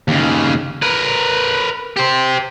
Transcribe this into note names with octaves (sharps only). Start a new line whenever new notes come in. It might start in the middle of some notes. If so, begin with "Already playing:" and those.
D#2 C#3
A#4 B4
G4 C5